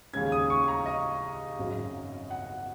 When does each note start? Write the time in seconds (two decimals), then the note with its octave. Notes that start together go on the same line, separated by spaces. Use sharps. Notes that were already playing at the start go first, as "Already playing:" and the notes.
0.13 D#2 C#3 G#3 C#4 G#6
0.32 D#6
0.50 C#6
0.68 A#5
0.86 D#5
1.58 G#1 F#2 C#3 F#3
2.31 F#5